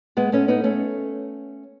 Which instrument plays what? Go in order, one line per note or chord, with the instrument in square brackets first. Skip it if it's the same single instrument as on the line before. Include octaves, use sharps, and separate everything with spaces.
[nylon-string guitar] G#3 B3
A3 C#4
B3 D#4
A3 C#4